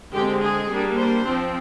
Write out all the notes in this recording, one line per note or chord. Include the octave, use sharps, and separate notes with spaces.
D3 G#3 C4 G4
G#4
G3 A#3 D4
C5
F3 C4